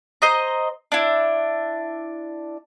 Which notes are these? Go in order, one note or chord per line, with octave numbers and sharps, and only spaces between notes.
C5 D#5 A#5
D4 E4